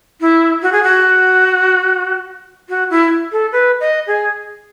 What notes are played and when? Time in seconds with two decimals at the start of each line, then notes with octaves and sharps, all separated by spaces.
0.21 E4
0.62 F#4
0.72 G#4
0.83 F#4
2.69 F#4
2.90 E4
3.32 A4
3.52 B4
3.80 D#5
4.07 G#4